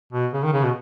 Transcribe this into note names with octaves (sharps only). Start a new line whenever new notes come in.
B2
C#3
D#3
C#3
B2